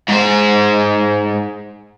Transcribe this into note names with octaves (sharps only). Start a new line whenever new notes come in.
G#2 C5